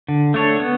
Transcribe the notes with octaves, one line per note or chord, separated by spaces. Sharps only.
D3
A3 D4 A4 C#5
B3